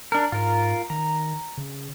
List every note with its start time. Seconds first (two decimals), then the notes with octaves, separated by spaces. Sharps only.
0.12 D4 A#4
0.32 G#2 F4 A#4
0.90 D#3 A#5
1.58 C#3